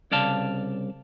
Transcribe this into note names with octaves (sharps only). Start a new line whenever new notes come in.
C2 C#3 D5 F5 A5